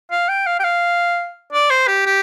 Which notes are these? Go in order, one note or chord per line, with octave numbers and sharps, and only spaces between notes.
F5
G5
F5
G5
F5
D5
C5
G4
G4